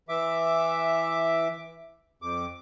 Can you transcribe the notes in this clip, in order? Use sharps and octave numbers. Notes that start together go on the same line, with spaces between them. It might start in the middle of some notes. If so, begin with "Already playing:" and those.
E3 E5 D6
F2 D6